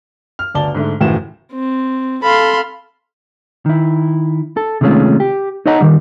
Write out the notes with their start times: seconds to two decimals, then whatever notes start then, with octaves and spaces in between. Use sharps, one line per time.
0.39 F6
0.55 G1 D2 D5 A5 G7
0.75 G#2 D3 A3
1.01 F#1 D#2 A2 E3 F#4 E7
1.53 C4
2.23 A4 F5 B5 C6
3.66 D#3 E4
4.57 A4
4.81 C3 D#3 G#3 A3 C#4 F4
5.20 G4
5.66 D#4 A4 C#5 D#5 F#5 A#5
5.81 D#2 D#3 G3